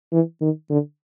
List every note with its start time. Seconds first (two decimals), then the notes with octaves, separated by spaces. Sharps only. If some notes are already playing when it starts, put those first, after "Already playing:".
0.13 E3
0.41 D#3
0.70 D3